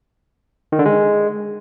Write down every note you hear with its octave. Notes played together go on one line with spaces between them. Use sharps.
D#3
D3
G#3